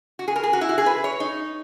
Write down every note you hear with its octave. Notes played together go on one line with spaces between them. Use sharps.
F#4
G#4
A#4
G#4
F#4
E4
F#4
G#4
B4
C#5
D#4